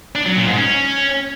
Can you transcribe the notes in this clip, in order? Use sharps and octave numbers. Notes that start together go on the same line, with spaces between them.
D4
F#3
A#2
G#2
C#4